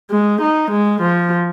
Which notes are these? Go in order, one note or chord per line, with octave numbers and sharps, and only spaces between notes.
G#3
D#4
G#3
F3